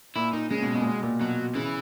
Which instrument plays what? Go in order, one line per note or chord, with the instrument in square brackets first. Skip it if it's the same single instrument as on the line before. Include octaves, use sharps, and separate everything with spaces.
[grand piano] A#2 [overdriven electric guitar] E4
[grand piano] A#2 [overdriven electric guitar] D#4
[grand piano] C#3 [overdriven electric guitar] G#3
[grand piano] B2
B2
A#2
B2
A#2
[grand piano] B2 [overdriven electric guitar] F#3
[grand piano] C#3 [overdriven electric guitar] E3